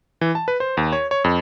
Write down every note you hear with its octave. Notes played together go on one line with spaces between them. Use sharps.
E3
A5
B4
C5
D#2
C#5
C#5
F2